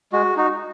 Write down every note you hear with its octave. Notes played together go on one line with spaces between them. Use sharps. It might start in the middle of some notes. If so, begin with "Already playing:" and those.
G#3 F#4
D#4 F#4